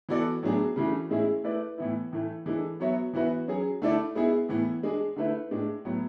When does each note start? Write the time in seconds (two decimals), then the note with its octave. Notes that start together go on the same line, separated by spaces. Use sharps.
0.09 E3 B3 F#4 A4 D5
0.43 A2 F#3 B3 D4 G#4
0.76 C#3 E3 A3 D4 F#4
1.10 A2 G#3 C#4 E4 G#4
1.44 A3 E4 B4 D5
1.78 A2 E3 B3 E4
2.12 A2 E3 A3
2.46 E3 G#3 D4 A4
2.80 F#3 B3 F#4 C#5 E5
3.13 E3 B3 F#4 B4 E5
3.48 F#3 C#4 G#4
3.82 D3 A3 E4 A4 D5
4.15 G#3 B3 E4 G#4
4.49 A2 E3 B3
4.83 G#3 D4 G#4
5.16 D3 A3 E4 B4
5.51 A2 G#3 D4
5.85 A2 F#3 B3